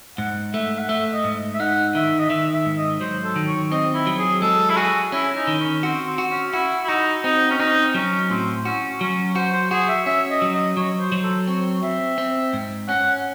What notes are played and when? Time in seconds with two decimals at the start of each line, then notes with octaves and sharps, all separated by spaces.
0.18 G#2 F#5
0.54 A3 E5
0.78 F#5
0.89 A3 E5
1.12 D#5
1.24 G#2
1.54 E5
1.60 D#4 F#5
1.95 D#3 E5
2.20 D#5
2.30 D#3 E5
2.54 E5
2.66 G#2
2.77 D#5
3.01 F#3 C5
3.24 A4
3.36 D#3
3.47 C#5
3.71 C4 D#5
3.94 E4
4.07 F#3
4.19 G#4
4.42 G#3 A4
4.70 E4
4.77 F#4 G#4
5.12 C#4 E4
5.36 D#4
5.47 D#3
5.60 C#4
5.83 C4 F#4
6.06 C4
6.18 F#4
6.30 C#4
6.53 E4 F#4
6.84 E4
6.89 D#4 F#4
7.24 C4 D#4
7.51 C#4
7.59 C4 D#4
7.94 F#3 C#4
8.30 A2 C4
8.65 C#4 F#4
9.01 F#3 C#4
9.36 F#4 C5
9.53 C5
9.71 F#4 G#4
9.88 E5
10.06 C#4 E5
10.30 D#5
10.42 F#3
10.53 D#5
10.77 F#3 C#5
11.00 C5
11.12 F#3
11.23 A4
11.47 C4 C#5
11.83 C4 E5
12.18 C4
12.53 G#2
12.89 C#4 F#5